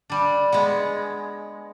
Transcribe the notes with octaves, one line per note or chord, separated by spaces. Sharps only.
G3 D4
G#3 B3